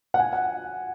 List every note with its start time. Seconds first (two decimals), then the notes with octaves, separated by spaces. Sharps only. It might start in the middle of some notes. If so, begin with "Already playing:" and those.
0.14 F#5
0.19 G#5
0.33 F#5